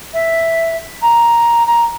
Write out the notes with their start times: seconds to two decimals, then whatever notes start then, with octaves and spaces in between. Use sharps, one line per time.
0.13 E5
1.02 A#5
1.66 A#5